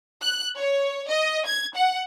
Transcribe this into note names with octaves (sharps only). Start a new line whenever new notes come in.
F#6
C#5
D#5
G#6
F#5